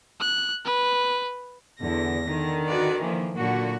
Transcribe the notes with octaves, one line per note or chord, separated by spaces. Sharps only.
F#6
B4
E2 D3 A#6
D3 D#3
F#4 B4 D5
E3 F3 A#3
A#2 D3 F#3 A#3 F#4